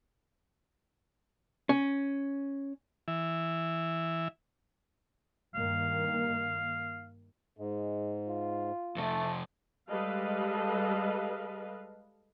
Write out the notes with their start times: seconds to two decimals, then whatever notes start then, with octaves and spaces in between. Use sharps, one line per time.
1.69 C#4
3.08 E3 E5
5.55 G2 D#3 A#3 F5
7.58 G#2 G#3
8.28 F4
8.96 F2 C3 A3
9.90 G3 G#3 A4 B4 D#5 F5